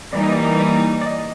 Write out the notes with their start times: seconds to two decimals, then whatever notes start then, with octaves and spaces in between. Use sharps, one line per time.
0.13 E3 G3 A#3 D#4 D5
0.23 D#5
0.32 D5
0.59 D5
1.01 D5
1.06 D#5